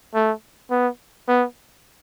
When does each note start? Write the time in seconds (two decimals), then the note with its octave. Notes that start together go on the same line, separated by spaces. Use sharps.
0.15 A3
0.71 B3
1.28 B3